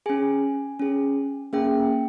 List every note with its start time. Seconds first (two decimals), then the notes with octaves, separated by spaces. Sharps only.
0.06 C#4 G#4 G#5
0.79 C#4 G#4
1.53 A#3 C#4 G#4 G5